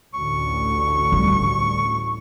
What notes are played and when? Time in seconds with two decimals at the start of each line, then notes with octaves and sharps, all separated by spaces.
0.14 A1 D2 C#6
1.12 G3